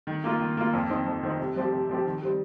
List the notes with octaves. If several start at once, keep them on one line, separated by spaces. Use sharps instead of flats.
D#3
A#3 F4
D#3
A#3 F4
F2
D#3 C4 D#4
F2
D#3 C4 D#4
C3
F3 C4 G4
C3
F3 C4 G4
D#3
G3 C4